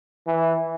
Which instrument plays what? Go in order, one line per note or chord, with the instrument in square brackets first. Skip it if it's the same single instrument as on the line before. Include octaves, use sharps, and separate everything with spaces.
[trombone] E3